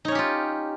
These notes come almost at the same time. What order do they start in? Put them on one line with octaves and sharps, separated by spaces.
D#4 C#5 C#4 G4 F4